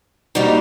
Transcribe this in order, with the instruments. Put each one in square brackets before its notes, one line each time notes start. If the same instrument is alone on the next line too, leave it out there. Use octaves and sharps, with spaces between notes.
[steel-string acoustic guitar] G3 A#3 D#4 F#4